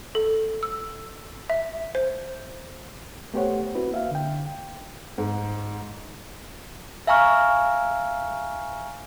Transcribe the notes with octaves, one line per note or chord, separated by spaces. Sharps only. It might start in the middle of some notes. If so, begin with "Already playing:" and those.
A4
E6
E5
C5
A3 B3 G4 C5 C#5 F#5
C4 E4 F#4 B4
A#3 E5 F5
D3 G5
G#2
E5 F5 G#5 A#5 C#6 F6